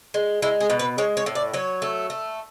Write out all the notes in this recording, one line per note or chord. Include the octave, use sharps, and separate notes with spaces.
G#3
G#3 E4
G#4
B2
B4
G#3 C#5
C#5
A2
D5
F#3 C#5
A3
A3